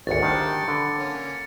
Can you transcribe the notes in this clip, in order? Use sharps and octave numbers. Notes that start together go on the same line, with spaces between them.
G#1 D2 C#5 A6 C#7
D#3 G3 D4 G5 A5
D3 B4 D5
A#3 C#4